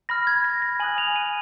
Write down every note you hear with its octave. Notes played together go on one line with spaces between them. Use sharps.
B5 F6 A#6
G#6
A#6
A#6
G#5 D#6 F#6 F#7
F7
D#7